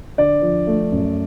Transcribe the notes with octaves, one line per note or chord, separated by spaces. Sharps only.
D3 D5
F3
A3
F#2